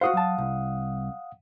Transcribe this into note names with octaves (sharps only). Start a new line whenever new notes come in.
F#4 G4 C5 F5 F#5 D#6
F#3 A5
C2